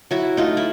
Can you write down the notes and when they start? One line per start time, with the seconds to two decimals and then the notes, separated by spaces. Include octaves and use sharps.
0.11 F#3 E4 F#4
0.37 A3 D#4 F4
0.57 E4